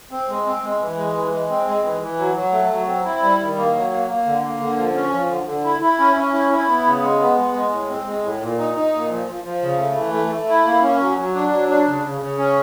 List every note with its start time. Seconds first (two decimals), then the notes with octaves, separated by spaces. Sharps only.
0.11 C4
0.28 G#3
0.45 C4
0.62 G#3
0.80 E3
0.97 G#3
1.14 E3
1.31 G#3
1.49 C4
1.66 G#3
1.84 E3
2.01 E3
2.19 F#3
2.35 F#3
2.52 A3
2.70 F#3
2.87 C4
3.05 E4
3.22 G3
3.39 D#3
3.56 A#3
3.74 F#3
3.91 A#3
4.08 A#3
4.26 D3
4.43 A#3
4.60 D3
4.77 F3
4.95 C#4
5.12 F3
5.29 D3
5.47 D3
5.64 E4
5.81 E4
5.99 C#4
6.16 C#4
6.33 E4
6.51 E4
6.68 B3
6.85 C#3
7.02 G#3
7.20 B3
7.37 G#3
7.54 G#3
7.71 A2
7.89 C4
8.06 G#3
8.23 A2
8.41 A#2
8.58 D#4
8.75 D#4
8.92 A#2
9.10 F3
9.27 F3
9.44 F3
9.62 C#3
9.79 A3
9.96 E3
10.13 A3
10.31 A3
10.48 E4
10.65 A#3
10.82 C#4
10.99 F#3
11.17 F#3
11.34 D4
11.52 F#3
11.69 D4
11.86 C#3
12.04 C#3
12.20 C#3
12.38 C#4